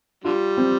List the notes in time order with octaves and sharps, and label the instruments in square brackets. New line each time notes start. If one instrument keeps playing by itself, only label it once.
[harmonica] D3 G3 [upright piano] F4
[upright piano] C4